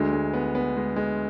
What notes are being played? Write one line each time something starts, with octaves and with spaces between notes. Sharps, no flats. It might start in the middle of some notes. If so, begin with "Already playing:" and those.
Already playing: D2 D3 G#3
G#3
B3
B3
G#3
G#3